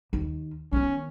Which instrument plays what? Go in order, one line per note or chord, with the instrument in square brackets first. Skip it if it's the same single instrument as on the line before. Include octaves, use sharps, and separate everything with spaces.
[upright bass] D#2
[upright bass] D#3 B3 [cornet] C#4